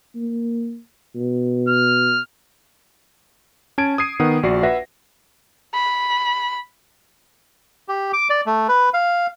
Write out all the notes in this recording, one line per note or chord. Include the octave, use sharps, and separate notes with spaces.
A#3
B2
F6
C#4 A5 G#6 D7
D#6 G#6 C7 D#7
D#3 B3 F#5 D#6
A#1 F#4 D5 C7
B4 E5 F#5 A#6
B5
G4
D6
D5
A3
B4
F5